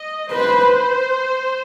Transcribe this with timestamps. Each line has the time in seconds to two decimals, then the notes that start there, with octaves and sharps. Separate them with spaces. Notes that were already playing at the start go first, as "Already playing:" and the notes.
Already playing: D#5
0.32 B4 C5